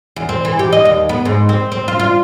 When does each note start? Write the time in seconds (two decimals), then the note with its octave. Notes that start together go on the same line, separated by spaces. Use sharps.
0.16 E2
0.29 C4
0.45 E3
0.59 G4
0.72 D#5
0.85 D#2
1.09 B3
1.25 G#2
1.49 C4
1.72 C4
1.88 F4
1.99 F4